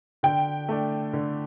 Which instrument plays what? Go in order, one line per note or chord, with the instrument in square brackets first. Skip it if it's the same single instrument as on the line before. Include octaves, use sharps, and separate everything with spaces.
[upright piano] D3 [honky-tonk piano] G5
[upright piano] A3 D4
D3